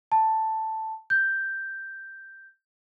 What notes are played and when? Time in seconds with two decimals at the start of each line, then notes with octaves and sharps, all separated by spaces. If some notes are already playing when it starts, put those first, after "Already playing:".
0.12 A5
1.10 G6